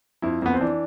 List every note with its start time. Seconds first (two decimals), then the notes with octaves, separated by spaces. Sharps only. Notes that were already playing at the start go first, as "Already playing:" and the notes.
0.22 F2 E4
0.42 F2 B3
0.53 C4
0.61 E3 D4